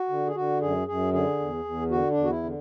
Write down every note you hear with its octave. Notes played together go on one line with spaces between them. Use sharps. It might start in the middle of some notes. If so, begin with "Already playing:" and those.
Already playing: F#4
D3
G#4
D3 F#4
F#2 G#4
F#2 G#4
D3 G#4
E2
E2
D3 F#4
D4
E2
F#4
E4
D3